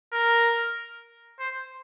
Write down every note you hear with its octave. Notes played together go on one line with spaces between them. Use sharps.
A#4
C5